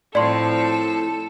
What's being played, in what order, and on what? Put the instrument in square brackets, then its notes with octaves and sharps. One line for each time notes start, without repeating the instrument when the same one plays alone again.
[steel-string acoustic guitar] A2 [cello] F3 C4 [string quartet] A4 [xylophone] D5 C6